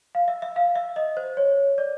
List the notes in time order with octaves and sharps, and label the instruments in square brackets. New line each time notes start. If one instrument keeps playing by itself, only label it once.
[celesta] F5
E5
E5
F5
E5
D#5
C5
C#5
D5